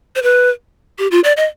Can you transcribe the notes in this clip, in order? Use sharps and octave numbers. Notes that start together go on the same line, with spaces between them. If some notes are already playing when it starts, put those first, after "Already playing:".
C5
B4
G4
F4
D5
D#5